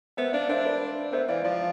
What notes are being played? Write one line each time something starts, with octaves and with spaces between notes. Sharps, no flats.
B3 C5 E5
D4 D5 F5
D4 C5 E5
B4 D5
B3 C5 E5
E3 D5 F5
F3 D5 F5